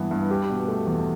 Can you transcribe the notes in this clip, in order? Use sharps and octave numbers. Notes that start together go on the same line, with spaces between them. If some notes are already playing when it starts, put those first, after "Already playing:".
Already playing: G2 E3 B3 E4
G2
G4
B2
A3
E2